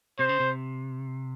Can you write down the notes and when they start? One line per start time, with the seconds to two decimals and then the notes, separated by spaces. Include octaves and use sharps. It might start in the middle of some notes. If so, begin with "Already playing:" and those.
0.19 C3 C5
0.29 C#3
0.40 C3